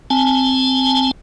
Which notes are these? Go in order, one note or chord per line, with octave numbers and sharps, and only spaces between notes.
C4 G#5 A5